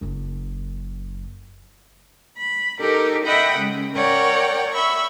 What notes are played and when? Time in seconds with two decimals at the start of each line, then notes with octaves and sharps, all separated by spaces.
0.01 F#1 F#2
2.37 B5
2.80 D#4 G4 A4 A#4
3.25 D#5 E5 F#5 G5 B5 D#6
3.56 C#3 G#3
3.96 A#4 C#5 D5 F#5 G5
4.72 E5 B5 C#6